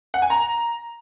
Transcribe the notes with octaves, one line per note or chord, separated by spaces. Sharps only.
F#5
G#5
A#5